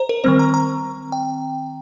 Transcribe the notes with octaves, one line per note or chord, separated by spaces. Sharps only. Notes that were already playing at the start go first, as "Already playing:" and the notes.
Already playing: C5 A#5
A#4
D#3 G3 C4 C5
A#5
A#5
G5